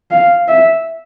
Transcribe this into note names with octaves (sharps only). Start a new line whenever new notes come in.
F5
E5